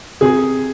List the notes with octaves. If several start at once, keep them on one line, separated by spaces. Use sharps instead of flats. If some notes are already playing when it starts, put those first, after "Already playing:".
C3 G#4